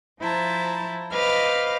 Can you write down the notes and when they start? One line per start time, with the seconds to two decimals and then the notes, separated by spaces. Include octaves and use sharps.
0.20 F3 E4 C5 A5 A#5
1.12 B4 C5 D#5 F5 D6 F6